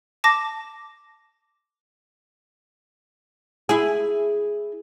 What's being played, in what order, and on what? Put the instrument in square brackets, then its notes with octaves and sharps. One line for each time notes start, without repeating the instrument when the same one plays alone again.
[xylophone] A5 D6 A#6
[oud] E4 G#4